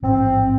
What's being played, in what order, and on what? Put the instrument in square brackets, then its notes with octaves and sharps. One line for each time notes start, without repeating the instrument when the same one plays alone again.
[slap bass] A1 G#2 F3 [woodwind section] C4